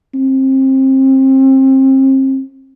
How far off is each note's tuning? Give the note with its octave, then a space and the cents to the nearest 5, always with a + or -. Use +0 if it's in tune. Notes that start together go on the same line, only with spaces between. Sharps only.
C4 +30